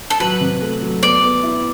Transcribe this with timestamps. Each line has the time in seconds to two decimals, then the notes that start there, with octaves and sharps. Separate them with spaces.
0.10 A4
0.20 F#3 B4
0.41 C3
0.61 A3
0.82 F#3
1.02 B3 D5
1.23 B3
1.43 E4